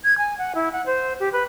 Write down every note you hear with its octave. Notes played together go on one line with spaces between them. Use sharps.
G#6
G#5
F#5
E4
F#5
C5
G4
B4